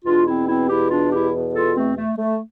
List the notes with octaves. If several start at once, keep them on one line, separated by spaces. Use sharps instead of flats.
E2 B2 D4 F4
C4 E4
C4 E4
E4 G4
D4 F4
E4 G4
F4 A4
A3 C4
A3
A3